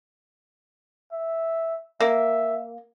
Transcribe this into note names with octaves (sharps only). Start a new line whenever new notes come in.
E5
A#3 E5